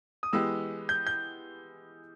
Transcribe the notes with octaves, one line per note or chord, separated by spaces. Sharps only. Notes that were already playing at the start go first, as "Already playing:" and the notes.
D#6
E3 G#3 B3 G4 E6
G6
G6